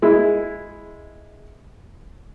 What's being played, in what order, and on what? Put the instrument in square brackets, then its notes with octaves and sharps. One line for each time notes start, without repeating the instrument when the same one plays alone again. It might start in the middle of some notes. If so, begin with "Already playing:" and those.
[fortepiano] G#3 E4